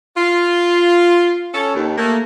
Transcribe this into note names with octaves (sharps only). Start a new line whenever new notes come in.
F4
C#4 A4
D#2
A3 A#3